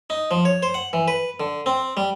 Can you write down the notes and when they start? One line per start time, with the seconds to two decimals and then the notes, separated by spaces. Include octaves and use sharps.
0.10 D#4
0.31 F3
0.45 C#5
0.63 C5
0.74 F#5
0.93 E3
1.08 B4
1.40 D3
1.66 C4
1.97 G3